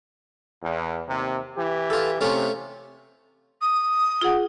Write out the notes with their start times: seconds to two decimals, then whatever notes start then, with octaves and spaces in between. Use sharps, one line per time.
0.63 E2
1.08 D#2 C3
1.56 E3 G4
1.90 F4 A4
2.21 C3 A3 C#4 F4
3.61 D#6
4.21 F4 G#4 F#5